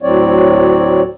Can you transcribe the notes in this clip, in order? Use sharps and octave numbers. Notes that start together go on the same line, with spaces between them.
D2 A2 F#3 C4 C#5 D5